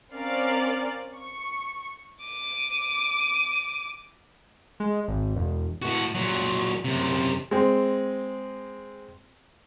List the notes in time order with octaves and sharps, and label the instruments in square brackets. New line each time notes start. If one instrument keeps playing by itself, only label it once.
[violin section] C4 C#4 A#4 D5 F5
C#6
[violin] D6 D#7
[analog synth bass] G#3
G#1
E1
[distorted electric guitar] A2 F#4
A#2 F#3
F#2 C3
[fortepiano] G#3 C4